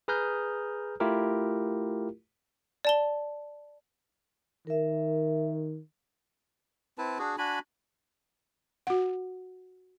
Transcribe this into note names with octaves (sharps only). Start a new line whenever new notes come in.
G#4 B4 A#5 D#6 F6 G6
A3 E4 F4 G4 A#4
D5 A5 G7
D#3 A#4 E5
C4 E4 B4 A5
D4 F#4 G#4
D4 F#4 G#5 B5
F#4 F#5